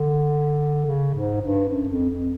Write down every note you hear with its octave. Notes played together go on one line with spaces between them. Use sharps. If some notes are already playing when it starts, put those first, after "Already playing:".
Already playing: D3
C#3
G#2
G2
F#2
F2
F2